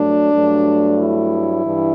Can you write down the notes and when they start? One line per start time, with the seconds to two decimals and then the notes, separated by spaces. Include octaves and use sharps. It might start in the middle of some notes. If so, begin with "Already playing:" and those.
Already playing: G2 F#3 A3 D4
0.34 G2 F#3 A3
0.99 E4
1.64 G2 E3